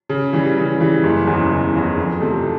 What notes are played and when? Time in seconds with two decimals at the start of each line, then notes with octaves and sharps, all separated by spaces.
0.09 C#3
0.33 E3 G3
0.57 C#3
0.81 E3 G3
1.04 F#1
1.27 E2 C#3 E3
1.50 F#1
1.74 E2 C#3 E3
1.98 F2
2.20 C3 F3 A3